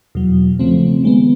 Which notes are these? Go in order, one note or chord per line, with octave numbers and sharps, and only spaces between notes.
E2 B2 F#3
C#3 F3 A3 C4
D#3 G#3 B3